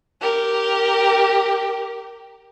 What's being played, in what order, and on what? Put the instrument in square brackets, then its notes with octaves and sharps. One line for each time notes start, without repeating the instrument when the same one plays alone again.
[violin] G4 A#4